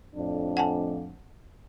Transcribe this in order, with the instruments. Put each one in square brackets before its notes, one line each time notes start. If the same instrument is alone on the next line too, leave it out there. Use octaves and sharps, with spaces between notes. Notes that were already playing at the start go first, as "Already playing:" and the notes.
[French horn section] F2 A2 D4
[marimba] F#5 G#5 A5